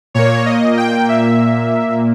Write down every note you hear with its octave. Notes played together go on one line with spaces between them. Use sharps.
A#2 A#3 C#5
D#5
G5
E5